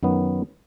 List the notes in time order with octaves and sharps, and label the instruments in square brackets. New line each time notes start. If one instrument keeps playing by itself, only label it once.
[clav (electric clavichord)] F#2 D#3 F#3 B3